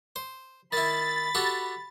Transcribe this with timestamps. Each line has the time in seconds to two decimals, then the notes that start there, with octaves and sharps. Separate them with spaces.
0.16 C5
0.72 D#3 E4 B5 A6
1.35 F#4 G4 A4